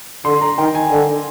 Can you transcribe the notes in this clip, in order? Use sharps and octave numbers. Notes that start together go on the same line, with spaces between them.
D3 C6
A#5
D#3 G5
G#5
D3